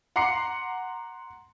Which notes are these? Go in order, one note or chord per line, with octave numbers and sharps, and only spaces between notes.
F#5 A#5 C6 D6 C7 C#7